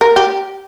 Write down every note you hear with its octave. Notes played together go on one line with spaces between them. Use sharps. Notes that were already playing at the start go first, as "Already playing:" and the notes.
A#4
G4